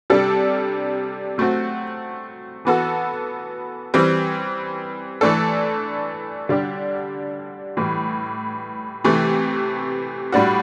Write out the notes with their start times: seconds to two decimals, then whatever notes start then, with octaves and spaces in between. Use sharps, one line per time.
0.10 C3 G3 D4 A4
1.38 F#3 A3 C4 F#4
2.65 E3 B3 F#4 A4
3.94 E3 G3 C4
5.21 E3 A3 D4 A4
6.49 D3 G3 D4 G4
7.77 A2 E3 G3
9.04 C3 E3 A3
10.32 A2 G3 D4 F#4